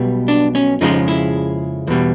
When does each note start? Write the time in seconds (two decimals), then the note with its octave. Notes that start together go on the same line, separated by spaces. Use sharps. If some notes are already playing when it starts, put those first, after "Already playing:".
Already playing: B1 B2 G3
0.28 D4
0.55 C#4
0.81 F2 C#3 F3 G#3 D#4
1.08 E4
1.87 E2 B2 G3